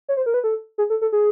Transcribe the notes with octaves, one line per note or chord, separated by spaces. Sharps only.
C#5
C5
A#4
B4
A4
G#4
A4
A4
G#4